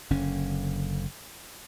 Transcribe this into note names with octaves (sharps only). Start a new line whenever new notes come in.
F#1 D3 C#4